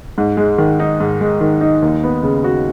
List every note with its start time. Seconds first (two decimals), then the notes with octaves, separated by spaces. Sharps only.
0.18 G#2
0.37 G#3
0.58 D#3
0.80 D#4
1.00 G#2
1.21 G#3
1.41 D#3
1.61 D#4
1.82 D#2
2.03 B3
2.23 C#3
2.44 F#4